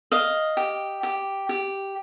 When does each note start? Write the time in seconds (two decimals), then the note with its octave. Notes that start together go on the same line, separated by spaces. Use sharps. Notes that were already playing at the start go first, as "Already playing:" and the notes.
0.12 D#5 F5
0.57 G4
1.03 G4
1.49 G4